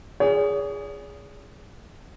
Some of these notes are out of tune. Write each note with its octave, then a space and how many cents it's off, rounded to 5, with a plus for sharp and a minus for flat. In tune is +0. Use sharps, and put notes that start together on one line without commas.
G#4 -10 C#5 +45